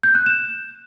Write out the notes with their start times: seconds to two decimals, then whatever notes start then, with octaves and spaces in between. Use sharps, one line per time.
0.03 G6
0.15 F#6
0.26 E7